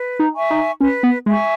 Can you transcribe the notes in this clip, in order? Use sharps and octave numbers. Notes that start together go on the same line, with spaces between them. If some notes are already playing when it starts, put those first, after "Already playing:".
Already playing: B4
D#4
E5 G#5 C#6
D#4
C#4 B4
B3
G#3 E5 G#5 C#6